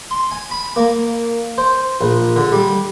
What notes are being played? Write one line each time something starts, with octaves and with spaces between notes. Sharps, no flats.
C6
G#5
B5
A#3
C5
A#1
D3
G3